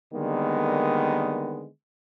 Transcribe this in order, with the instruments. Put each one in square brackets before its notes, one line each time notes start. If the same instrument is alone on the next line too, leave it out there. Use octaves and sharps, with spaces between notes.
[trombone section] D3 D#3 G3 G#3 A#3 B3